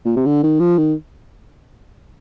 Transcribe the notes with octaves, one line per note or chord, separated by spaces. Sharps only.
A#2
C3
D3
D#3
F3
D#3